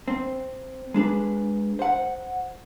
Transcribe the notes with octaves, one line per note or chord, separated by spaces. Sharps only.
C4
G#3 D4 G#4 B4
C5 F#5